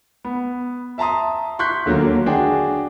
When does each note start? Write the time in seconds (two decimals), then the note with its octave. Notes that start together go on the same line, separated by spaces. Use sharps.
0.25 B3
0.98 E5 A5 A#5 C6 D#6
1.59 C6 C#6 F#6 G6 B6
1.86 D#2 D3 F#3 A#3
2.26 D4 F#4 G#4 G5